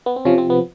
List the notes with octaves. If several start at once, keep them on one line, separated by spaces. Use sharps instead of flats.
B3
C4
C3 F3 C#4
C4
B3